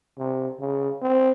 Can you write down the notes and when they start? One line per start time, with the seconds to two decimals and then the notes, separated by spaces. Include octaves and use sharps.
0.18 C3
0.60 C#3
1.02 C4